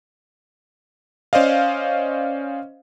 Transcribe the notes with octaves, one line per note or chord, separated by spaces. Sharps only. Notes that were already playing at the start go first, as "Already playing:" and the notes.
C#4 C5 D5 D#5 F5